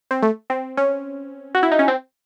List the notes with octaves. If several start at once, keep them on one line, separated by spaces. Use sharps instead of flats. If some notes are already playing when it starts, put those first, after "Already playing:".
C4
A3
C4
C#4
F#4
E4
D#4
C#4
C4